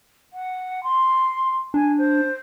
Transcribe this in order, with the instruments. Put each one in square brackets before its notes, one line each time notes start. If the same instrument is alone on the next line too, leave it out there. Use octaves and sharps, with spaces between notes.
[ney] F#5
C6
[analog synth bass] D4 [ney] G#5
[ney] C5